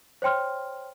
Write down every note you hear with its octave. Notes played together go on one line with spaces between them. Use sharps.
C5 C#5 G5 C6 F6